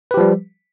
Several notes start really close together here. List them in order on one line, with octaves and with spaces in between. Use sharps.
B4 G4 F3 G3